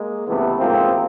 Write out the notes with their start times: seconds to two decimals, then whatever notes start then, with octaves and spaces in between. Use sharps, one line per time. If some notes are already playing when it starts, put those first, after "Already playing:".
Already playing: G#3 A#3
0.26 C#2 C3 E3 A3 B3
0.59 A1 G#2 F3 A#3 C4